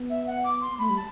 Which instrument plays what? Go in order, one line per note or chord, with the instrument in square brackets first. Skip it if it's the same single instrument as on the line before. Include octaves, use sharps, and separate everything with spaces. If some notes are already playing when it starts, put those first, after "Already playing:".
Already playing: [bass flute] B3
[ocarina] E5
F#5
D6
C6
[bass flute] A3 [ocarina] B5
[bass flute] G3
[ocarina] A5